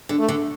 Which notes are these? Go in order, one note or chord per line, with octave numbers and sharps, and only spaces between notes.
D3
A3
D3